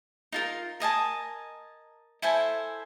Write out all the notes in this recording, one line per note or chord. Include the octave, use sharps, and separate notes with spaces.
D#4 F4 A#4
A#4 D#5 G#5 A5
E4 A4 C5 G#5